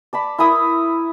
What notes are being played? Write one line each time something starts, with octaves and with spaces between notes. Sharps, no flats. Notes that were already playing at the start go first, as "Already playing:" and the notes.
D5 A5 B5
E4 A#4 B5 D#6